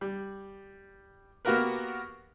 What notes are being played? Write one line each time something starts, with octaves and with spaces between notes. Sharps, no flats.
G3
A#3 B3 F#4 G4 A#4 B4